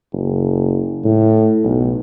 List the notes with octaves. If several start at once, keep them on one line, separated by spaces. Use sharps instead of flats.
F#1
A2
B1